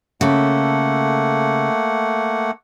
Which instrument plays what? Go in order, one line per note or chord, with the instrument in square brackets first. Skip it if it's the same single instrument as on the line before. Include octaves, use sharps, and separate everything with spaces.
[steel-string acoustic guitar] C#3 A4 [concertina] A3 A#3 F#5